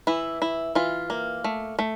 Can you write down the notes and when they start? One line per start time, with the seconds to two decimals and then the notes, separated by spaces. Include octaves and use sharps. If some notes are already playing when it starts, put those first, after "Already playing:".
0.07 E3 E4
0.42 E4
0.75 E3 F4
1.10 A#3
1.44 A3
1.79 A3